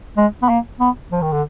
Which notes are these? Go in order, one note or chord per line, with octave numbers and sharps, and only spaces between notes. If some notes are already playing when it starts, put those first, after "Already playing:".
G#3
B3
A#3
B3
F3
D#3
D3